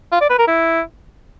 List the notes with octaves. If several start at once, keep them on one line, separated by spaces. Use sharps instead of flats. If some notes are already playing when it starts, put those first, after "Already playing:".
F4
D5
B4
A#4
E4